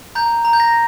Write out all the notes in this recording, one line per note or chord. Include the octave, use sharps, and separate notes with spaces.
A#5 G6
A#5
G6
A#6